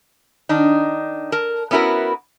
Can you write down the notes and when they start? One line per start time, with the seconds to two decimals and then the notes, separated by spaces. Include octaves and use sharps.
0.49 D#3 D4 D#4
1.32 A#4 A5
1.71 B3 C#4 E4 F#4 A#4